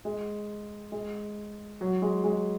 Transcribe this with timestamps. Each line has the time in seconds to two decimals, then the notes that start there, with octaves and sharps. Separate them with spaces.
0.05 G#3
0.92 G#3
1.81 F#3
2.02 G#3
2.24 G#3